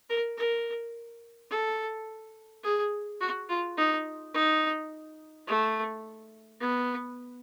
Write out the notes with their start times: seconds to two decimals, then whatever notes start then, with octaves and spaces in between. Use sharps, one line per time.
0.10 A#4
0.38 A#4
1.51 A4
2.64 G#4
3.21 F#4
3.49 F4
3.78 D#4
4.34 D#4
5.47 A3
6.61 B3